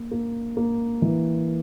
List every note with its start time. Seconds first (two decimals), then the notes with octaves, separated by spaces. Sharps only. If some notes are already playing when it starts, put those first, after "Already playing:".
Already playing: A#3
0.11 A#3
0.57 A#3
1.02 E3